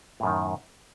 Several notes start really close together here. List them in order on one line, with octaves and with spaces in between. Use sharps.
A2 F#2 D#3